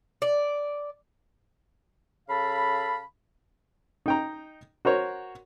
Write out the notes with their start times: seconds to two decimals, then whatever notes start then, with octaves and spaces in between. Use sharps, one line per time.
0.22 D5
2.29 C#3 A4 F5 A5 B5
4.06 D#4 G5 A#5
4.85 F#4 A#4 C5 C#5